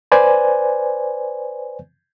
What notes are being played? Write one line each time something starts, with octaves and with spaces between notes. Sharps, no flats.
B4 C5 D5 G#5